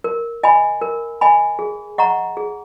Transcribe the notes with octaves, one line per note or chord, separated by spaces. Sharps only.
A#4
D#5 G#5 B5
A#4
D#5 G#5 B5
G#4
D#5 F#5 A#5 C#6
G#4